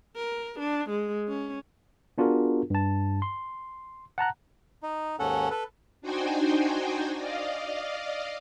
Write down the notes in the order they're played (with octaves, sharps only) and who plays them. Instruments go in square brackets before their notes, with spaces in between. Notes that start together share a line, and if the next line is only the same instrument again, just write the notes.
[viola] A#4
D4
G#3
C#4
[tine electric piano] B3 D4 F4 F#4 G#4 A#4
G2 A5
C6
F#5 A5 A#5 F#6
[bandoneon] D#4
D#2 G#2 C#4 A4 F#5
A4 B4
[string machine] D4 D#4 F#4 C5 G5 G#5
D5 D#5 F5